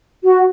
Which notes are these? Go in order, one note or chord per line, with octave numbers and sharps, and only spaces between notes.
F#4